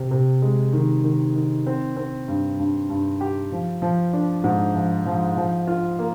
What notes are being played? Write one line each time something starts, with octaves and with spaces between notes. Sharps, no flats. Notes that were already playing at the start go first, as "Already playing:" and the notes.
Already playing: C3
C3
G#3
D#3
D#3
D#3
C4
C4
G2
G2
G2
G4
F3
F3
D4
G#2
F3
F3
F3
F4
A#3